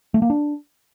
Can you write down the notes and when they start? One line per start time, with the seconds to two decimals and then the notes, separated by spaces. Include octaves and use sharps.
0.14 A3
0.22 A#3
0.30 D4